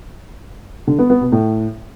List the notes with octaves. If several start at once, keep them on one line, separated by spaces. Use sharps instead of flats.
D3
B3
B3
B2
A2